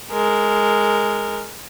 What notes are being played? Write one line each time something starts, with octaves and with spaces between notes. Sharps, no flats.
G#3 A#4